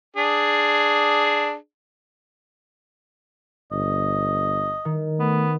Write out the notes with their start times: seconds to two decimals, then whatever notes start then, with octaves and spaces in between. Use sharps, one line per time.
0.16 D4 G#4
3.72 G1 D#5
4.85 D#3
5.20 A3 B3